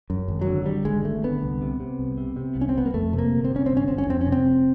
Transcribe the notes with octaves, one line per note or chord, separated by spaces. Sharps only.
F#2
G#1
F#3
D3
D3 G3
G#1 G#3
G#1 A3
D3 B3
C2
C3
C3
C2
C3
C3
C2
C#4
C4
C2 B3
A#3
F2 A3
C3
A#3
G1
C4
C3 C#4
G1 C4
C#4
G1 C4
C#4
F2 C4
C#4
C3
C4
F1